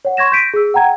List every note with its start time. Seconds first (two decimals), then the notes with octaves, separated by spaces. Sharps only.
0.05 C#5 F#5
0.17 C6 C#6 G#6 A#6 E7
0.32 G6 A#6 B6 D7 D#7
0.54 G#4 E6
0.74 F#5 G5 A#5 G#6